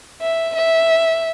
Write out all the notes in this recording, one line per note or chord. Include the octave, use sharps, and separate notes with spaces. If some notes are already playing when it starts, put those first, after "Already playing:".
E5
E5